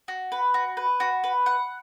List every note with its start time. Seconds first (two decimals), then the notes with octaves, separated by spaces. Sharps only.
0.08 F#4
0.32 B4
0.54 F#4
0.77 B4
1.00 F#4
1.24 B4
1.46 F#5